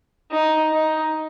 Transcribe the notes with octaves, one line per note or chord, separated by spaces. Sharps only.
D#4
D#4